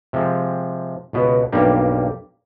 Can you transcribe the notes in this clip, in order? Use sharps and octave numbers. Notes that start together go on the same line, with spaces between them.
C3 F3 G#3
C#2 B2 B3
B1 G2 G3 A#3 G4